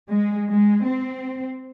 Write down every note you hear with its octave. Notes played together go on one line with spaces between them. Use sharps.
G#3
G#3
C4